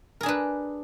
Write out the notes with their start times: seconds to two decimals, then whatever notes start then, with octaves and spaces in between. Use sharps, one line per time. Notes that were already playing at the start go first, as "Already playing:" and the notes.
0.21 A#4
0.23 G#4
0.26 D4
0.28 B4